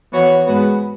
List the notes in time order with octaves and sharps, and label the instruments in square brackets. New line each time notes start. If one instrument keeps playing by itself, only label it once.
[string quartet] E3 B3 F#4 C#5
G#2 G#3 B3 F#4 B4